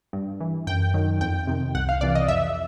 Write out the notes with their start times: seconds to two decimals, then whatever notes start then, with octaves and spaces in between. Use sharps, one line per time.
0.13 G2
0.41 E3
0.67 F#2 G5
0.94 D#3 F#3
1.21 F2 G5
1.47 C3 D#3
1.75 C2 F#5
1.89 F5
2.01 C3 E3 D5
2.15 D#5
2.28 F2 E5